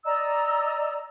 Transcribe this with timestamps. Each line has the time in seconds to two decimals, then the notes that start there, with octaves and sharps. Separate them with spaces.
0.06 D5 D#5 A#5 E6